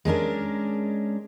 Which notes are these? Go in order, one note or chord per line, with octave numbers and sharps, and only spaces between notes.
G#3 C#4 D4 A#4